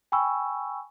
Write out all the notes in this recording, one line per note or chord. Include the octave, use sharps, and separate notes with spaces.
G5 G#5 B5 C#6 E6